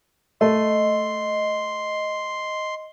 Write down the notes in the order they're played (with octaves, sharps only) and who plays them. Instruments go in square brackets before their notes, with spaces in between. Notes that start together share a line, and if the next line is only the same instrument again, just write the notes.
[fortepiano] A3 [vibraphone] D#5 [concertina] C6